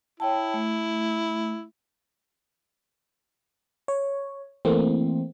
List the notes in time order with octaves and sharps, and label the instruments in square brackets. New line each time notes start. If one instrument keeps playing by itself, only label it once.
[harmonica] E4 [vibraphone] C#5 G5 A5
[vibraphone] A3
[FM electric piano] C#5
E3 A3 A#3 C4